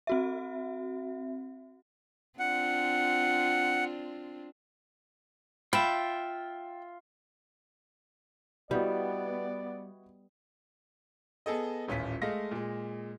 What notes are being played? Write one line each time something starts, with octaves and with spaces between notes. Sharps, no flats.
C4 F#4 E5
C4 D4 F4 F#5
F4 E5 G5 B5
G3 B3 E4 F#4 D5 D#5
B3 G#4 A4 D#5
D#1 A1 C#4 F4 B6
G#3 A3 D#5 F5 A#6
A#2 G#3